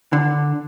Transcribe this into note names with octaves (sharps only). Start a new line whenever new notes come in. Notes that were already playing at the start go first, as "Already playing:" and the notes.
D3